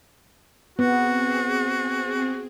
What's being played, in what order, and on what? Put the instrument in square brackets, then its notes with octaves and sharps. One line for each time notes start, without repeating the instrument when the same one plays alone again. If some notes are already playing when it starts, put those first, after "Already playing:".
[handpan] B3 [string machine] C4 G#4 [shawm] F#4